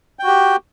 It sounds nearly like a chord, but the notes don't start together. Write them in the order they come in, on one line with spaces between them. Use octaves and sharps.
G5 F#4 G4